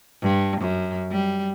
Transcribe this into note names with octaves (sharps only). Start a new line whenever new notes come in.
G2
F#2
G3